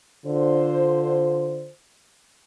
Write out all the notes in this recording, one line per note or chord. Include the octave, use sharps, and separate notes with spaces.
D3 F4 C5